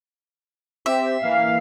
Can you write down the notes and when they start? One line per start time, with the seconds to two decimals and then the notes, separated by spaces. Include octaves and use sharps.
0.86 C4 G4 E5
1.23 E3 A#3 F5